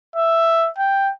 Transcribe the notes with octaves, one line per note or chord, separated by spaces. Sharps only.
E5
G5